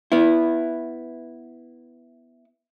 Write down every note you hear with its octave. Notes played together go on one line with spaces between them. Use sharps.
B3 E4